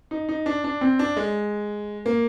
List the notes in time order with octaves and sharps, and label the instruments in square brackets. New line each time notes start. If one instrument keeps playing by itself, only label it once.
[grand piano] D#4
D#4
D4
D4
C4
D4
G#3
A#3